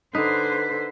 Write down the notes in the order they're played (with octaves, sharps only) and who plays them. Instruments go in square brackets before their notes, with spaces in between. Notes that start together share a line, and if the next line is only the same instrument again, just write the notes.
[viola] D3 [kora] D#4 [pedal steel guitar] B4 [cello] C5